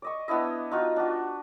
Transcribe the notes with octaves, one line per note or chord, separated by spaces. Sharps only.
D5 D#5 C#6
B3 D4 E4 D#5
D#4 F4 F#4
D4 F#4